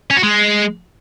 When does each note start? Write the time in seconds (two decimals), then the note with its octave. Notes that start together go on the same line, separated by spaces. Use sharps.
0.11 C#4
0.17 F#4
0.23 G#3